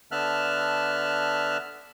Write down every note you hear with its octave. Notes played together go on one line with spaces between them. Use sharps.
D3 B3 E5 A5 F6 F#6